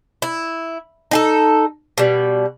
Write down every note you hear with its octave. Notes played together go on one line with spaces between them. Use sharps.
E4
D#4 G#4 A4
B2 G3